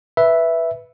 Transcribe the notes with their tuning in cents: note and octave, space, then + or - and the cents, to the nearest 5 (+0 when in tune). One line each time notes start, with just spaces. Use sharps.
B4 +0 E5 +0